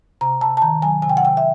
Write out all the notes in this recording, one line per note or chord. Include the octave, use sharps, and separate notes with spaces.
C3 A#5
C3 A5
A5
D#3 A#5
F#3 G#5
C3 G#5
G5
F#5
C3 G5
E5